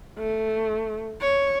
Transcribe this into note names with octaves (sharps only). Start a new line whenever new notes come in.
A3
C#5